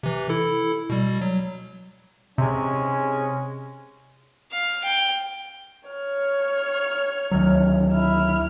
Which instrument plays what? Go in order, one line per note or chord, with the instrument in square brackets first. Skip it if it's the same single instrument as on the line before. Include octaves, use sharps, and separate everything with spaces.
[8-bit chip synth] C3 E3
E4 A4
B2 G3
F#3
[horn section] G#2 G#3 C#4 [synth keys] C3
[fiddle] F5
G5
[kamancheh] C#5 F6
[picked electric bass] D2 D#3 F#3
[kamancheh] E4 F6